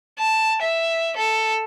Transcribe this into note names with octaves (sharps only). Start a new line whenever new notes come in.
A5
E5
A4